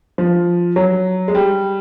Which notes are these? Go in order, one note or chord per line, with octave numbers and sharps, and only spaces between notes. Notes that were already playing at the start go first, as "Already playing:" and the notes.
F3
F#3
G#3
G3